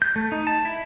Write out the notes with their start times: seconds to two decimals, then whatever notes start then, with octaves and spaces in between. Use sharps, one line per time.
0.02 G6
0.16 A3
0.32 D#4
0.47 A5
0.65 E4